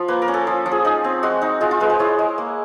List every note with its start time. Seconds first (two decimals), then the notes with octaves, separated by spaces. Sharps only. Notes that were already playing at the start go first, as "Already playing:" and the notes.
Already playing: F3 F4
0.08 A#3 B4
0.22 A#4
0.28 C#4
0.34 A4
0.47 F3
0.66 F3
0.72 G#4
0.85 D#4 G#4
1.04 C4
1.23 G#3 F#4
1.42 D#4
1.61 G#3 F4
1.71 F4
1.80 G#3 B4
1.90 C5
1.99 E4 C#5
2.19 G#3
2.38 A#3